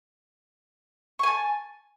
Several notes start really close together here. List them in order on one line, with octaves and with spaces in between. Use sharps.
C#6 G#5 A5